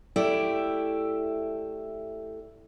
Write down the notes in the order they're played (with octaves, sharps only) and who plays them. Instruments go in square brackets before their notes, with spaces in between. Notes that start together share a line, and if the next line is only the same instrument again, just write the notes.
[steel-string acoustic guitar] A3 E4 G4 D5